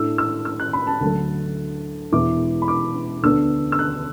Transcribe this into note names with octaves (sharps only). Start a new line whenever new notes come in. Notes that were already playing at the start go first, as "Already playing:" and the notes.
Already playing: A2 A3 D4 E6
E6
E6
F#6
B5
A5
D2 D3 F#3 A3 A5
E1 E2 E3 B3 E4 D6
B5
D6
D2 D3 B3 D4 E6
E6
F#6